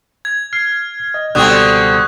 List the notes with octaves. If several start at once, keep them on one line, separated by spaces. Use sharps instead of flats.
G#6
F6 C7
D#5
C#2 B2 D3 G3 C4 C#6 D#6 F#6